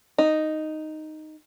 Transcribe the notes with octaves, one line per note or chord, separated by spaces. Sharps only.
D#4